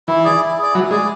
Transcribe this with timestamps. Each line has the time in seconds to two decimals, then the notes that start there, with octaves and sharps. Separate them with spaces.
0.08 E3 E4
0.24 G#4 D5
0.42 E4
0.58 G#4 D5
0.74 F#3 E4
0.91 G#3 G#4 D5